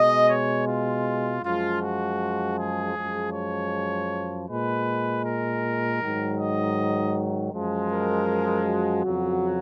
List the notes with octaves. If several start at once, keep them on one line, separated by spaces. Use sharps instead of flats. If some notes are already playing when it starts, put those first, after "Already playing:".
Already playing: B2 G#3 D#5
C#5
F4
F#2 F3 G#3 F4
F#4
G#4
F#2 F3 G#3
C#5
A#2 G#3 B4
A#4
G#2 D#3 F#3
D#5
F#2 F3 G#3
A#4
F#4
F2 C#3 F#3